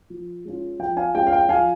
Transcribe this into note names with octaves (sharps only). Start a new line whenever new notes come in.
F3
G#3 C#4 F4
F3 G5
F5 G#5
G#3 C#4 F4 G5
F5
G5
F3 F5 G#5